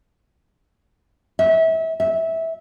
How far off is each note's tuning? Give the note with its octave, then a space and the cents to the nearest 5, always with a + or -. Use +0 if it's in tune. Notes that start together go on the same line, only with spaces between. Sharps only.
E5 -30
E5 -15